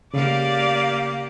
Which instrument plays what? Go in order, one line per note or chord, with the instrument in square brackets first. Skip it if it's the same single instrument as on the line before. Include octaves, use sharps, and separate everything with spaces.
[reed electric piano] C#3 [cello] A#3 G4 [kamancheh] D5 F5